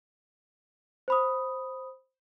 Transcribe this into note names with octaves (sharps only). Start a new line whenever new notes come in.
C5 B5 D#6